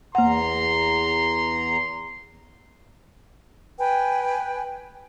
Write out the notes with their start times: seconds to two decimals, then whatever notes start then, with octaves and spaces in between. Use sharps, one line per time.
0.15 E2 A#3 F#5 A#5 C6
3.79 B4 G5 G#5